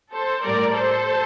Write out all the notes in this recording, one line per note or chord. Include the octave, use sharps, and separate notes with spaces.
A4 C5
A2 G3 A#4 D5
A4 C5